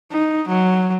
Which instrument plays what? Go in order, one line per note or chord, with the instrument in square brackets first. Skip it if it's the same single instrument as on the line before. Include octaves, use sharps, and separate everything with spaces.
[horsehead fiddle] D#4
F#3